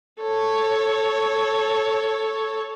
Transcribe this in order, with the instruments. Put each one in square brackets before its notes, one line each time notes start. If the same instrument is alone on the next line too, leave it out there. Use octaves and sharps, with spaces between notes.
[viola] A4 C#5